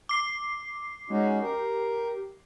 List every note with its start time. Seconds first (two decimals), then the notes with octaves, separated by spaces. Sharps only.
0.09 D6 C7
1.10 G#3 C#4 D#4 F#4
1.42 G4 A#4